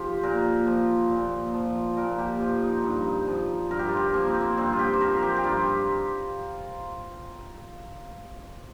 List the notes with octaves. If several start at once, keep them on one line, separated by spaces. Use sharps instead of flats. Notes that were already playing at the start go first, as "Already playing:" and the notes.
Already playing: F3 F4 G4
A#2 A#4
F3
A#2
F3
A#2 A#4
G4
F3 F4
D#4
G2
F3
G2 A#4
G4
F4
G4
F3 A#3
C4
A#3
G2 C4
F4
G4
C5
F3 A#4
A#4
G4
G4
G2 F4